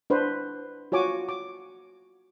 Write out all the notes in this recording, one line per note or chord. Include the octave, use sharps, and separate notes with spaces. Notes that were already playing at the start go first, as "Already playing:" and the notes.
D4 B4 C5
F4 F#4 C#5 G#5 D6
D6